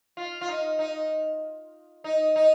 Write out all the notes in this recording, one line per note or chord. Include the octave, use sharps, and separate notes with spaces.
F4
F4
D#4
D#4
D#4
D#4